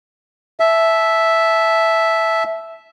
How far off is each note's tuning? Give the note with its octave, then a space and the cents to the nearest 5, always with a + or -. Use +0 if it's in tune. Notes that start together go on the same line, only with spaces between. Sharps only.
E5 +0 A5 -30